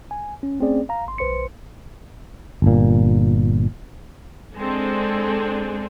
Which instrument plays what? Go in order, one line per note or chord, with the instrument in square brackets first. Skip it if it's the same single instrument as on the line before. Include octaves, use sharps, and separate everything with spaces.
[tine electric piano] G#5
C#4
A3 C4 C#4 G#4 D5
F5 A#5
G#1 C6
B1 B4 C5 C6 C#7
[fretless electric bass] G1 A#2
[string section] G#3 C4 D4 G#4 A4